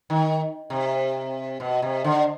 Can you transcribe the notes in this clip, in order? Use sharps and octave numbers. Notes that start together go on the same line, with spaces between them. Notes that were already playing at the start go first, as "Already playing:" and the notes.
D#3
C3
B2
C3
D3